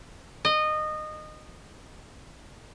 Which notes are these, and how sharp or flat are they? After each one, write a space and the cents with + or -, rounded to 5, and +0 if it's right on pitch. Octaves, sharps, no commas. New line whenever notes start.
D#5 -20